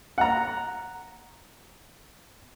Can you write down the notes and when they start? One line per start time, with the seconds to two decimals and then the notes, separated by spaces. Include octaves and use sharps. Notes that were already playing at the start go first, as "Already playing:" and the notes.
0.18 F#5 A#5